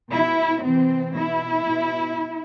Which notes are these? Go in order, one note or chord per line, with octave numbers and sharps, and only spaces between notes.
B2 E4
C3 E3 C4
B2 E4
B2